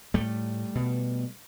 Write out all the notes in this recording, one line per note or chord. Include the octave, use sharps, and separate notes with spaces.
A2 G3 A3
B2